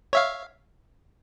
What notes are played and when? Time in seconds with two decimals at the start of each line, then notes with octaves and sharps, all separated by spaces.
0.13 C#5 E5 F5